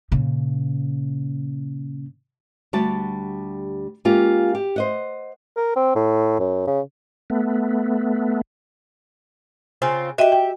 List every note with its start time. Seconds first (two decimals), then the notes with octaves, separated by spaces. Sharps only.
0.12 A#2 C#3
2.73 D2 G3 F#4 G4 A5
4.05 G#3 A#3 C#4 F4 G4
4.55 G4
4.76 C5 D#5 F#5
5.57 A#4
5.76 C4
5.95 A2
6.40 F#2
6.67 C#3
7.30 A3 B3
9.82 C#3 C4 F4
10.18 F#4 G4 D#5 E5 G5
10.32 G5